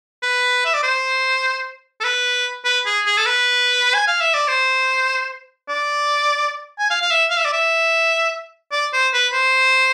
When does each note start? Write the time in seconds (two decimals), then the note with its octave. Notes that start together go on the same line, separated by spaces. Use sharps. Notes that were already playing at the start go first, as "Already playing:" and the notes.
0.23 B4
0.65 E5
0.74 D5
0.83 C5
2.01 A4
2.04 B4
2.65 B4
2.86 G#4
3.06 G#4
3.18 A4
3.26 B4
3.94 G#5
4.08 F5
4.21 E5
4.34 D5
4.48 C5
5.69 D5
6.79 G#5
6.90 F5
7.02 F5
7.11 E5
7.30 F5
7.38 E5
7.45 D5
7.53 E5
8.72 D5
8.93 C5
9.13 B4
9.33 C5